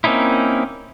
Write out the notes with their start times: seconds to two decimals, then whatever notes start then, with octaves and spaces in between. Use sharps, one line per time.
0.04 A#3 C4 C#4 D#4 E4